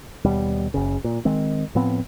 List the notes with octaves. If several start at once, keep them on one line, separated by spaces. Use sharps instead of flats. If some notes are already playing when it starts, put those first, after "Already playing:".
D#2 B2 G3
F#1 C#3
A#2
D#3 G#3 C4
A2 F3 B3 C4